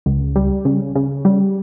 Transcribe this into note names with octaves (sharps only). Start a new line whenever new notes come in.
C#2
G3
C#3
C#3
G3